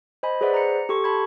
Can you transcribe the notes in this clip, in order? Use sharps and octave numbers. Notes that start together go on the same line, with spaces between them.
C5 D#5 G#5 B5
G#4 B4 C5 D5 E5 F#5
A#5 C#7
G4 A4 C6 C#6
A5 B5 C6 G#6